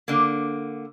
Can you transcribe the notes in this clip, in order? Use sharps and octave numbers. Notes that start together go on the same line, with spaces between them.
D3 A#3